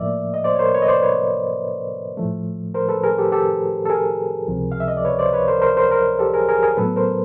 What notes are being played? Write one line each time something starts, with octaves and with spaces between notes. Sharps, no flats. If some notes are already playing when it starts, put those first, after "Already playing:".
Already playing: A2 F3 A#3 D5 E5
D#5
C5 D5
C#5
A#4 C5
B4 C#5
D#5
C5 D5
B4 C#5
A2 F3 A3
A#4 C5
A4 B4
G#4 A#4
G4 A4
G4 A4
A4
G#4 A#4
C#2 C3 F3
F5
E5
D#5
D5
B4 C#5
C5 D5
B4 C#5
A#4 C5
A#4 C5
A#4 C5
A#4 C5
G4 A4
G#4 A#4
G#4 A#4
G#4 A#4
A2 F#3 B3 A4 B4
A#4 C5